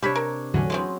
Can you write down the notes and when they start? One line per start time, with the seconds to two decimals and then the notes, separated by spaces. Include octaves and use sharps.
0.02 C3 G3 D4 C#5 B5
0.16 A#4
0.54 E2 A2 D3 F#3 C#4
0.70 G#3 B3 C4